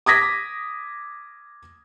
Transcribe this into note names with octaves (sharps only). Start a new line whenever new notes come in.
D6 D#6 G#6 A#6 B6